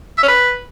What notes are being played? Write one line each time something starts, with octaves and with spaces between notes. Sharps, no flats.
E5
C#4
B4